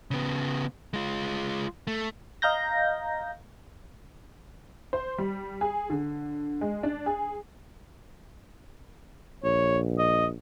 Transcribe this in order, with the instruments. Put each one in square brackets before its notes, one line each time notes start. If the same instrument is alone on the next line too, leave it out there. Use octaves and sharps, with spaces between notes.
[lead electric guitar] C#3 B3
G#3 F4
A3
[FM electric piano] D#5 F5 A#5 G6 A#6
[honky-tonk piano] C5
G3
G#4
D3
G#3
D4
G#4
[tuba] A#1 [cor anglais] C#5
[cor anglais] D#5